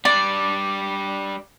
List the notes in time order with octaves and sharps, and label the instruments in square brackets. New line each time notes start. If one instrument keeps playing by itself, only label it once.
[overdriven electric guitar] G3 D4 [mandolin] D5